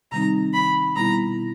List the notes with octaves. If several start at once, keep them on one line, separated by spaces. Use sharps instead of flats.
C3 D#3 G3 C4 D#4 A#5
B5
B2 G3 B3 E4 A#5